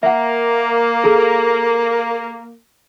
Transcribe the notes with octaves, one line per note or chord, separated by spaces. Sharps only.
A#3 E5 F#5
G#4 A4 A#5